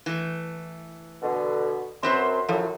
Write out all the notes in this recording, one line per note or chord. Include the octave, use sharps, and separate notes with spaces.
E3 A3
B2 D3
F#2 C4 B4 C5 C6
F#2 A2 F3